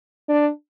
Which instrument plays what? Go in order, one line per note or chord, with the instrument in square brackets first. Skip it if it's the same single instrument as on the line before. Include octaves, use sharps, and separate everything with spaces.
[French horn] D4